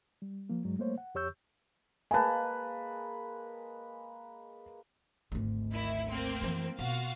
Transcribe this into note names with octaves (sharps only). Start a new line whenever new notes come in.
G3
F3 A#3
G2 F#3 G#3
G3 A3 A#3 C5 C#5
F#5
F2 G4 C#5 C#6 E6 G6
G#3 A#3 B4 G#5 A5
G#1 D2
D#3 E4
A3 A#3 C4
F#2 E3
B2 F4 F#4 F5